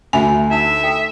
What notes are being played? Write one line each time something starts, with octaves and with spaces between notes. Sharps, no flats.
D2 F#4 E5 G#5 B5
D#4 E5 F#5 E6
A4 G5